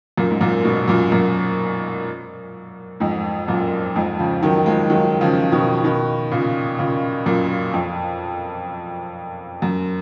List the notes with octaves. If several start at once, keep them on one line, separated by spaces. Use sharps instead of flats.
F#2 A#2
G#2
F#2 A#2
G#2 B2
F#2 A#2
F#2 A#2
F2 G#2
F#2 A#2
F2 G#2
C#3 F3
D#3 F#3
F3 G#3
D#3 F#3
C#3 F3
B2 D#3
B2 D#3
A#2 C#3
A#2 C#3
F#2 A#2
F2
F#2